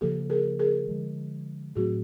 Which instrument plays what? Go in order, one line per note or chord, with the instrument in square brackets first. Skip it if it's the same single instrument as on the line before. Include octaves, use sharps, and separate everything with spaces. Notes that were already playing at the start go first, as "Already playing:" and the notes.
[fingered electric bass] C#3 F3 A#3 [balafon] G4 A4
[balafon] G#4 A#4
G#4 A#4
[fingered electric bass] D3 F3 G#3
[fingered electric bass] A2 F#3 A3 C4 [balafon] F#4 G#4